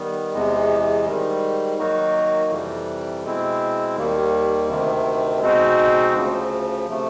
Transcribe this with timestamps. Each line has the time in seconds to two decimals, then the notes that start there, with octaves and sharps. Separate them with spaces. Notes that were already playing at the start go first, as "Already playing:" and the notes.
Already playing: D#3 G3 B3
0.33 E2 C3 E3 G#3 B3
1.06 G#2 D#3 G3
1.79 D#3 F#3 A#3 D#4 F#4
2.51 F2 C3 E3 G3
3.24 B2 G#3 C4 E4
3.96 D#2 D#3 G3 A#3
4.68 D2 C3 D#3
5.41 B2 G#3 C4 D#4 F#4
6.13 D2 C#3 F3
6.88 C3 F3 A3